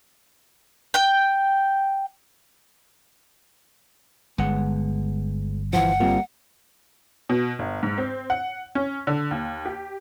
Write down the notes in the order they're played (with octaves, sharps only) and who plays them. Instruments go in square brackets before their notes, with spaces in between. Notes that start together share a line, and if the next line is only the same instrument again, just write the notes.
[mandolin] G5 G6
[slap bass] G1 [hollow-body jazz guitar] G#3 B3 F#5
[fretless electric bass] E3 F3 [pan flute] F#5
[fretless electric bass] G3 A#3 [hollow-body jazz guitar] C4 F4
[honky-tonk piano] B2
G1
G#2
C4
F#5
C#4
D3
D#2
G4